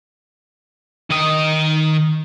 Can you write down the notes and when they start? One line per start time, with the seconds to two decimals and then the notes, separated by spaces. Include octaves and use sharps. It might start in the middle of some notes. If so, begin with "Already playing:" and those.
1.10 D#3 D#5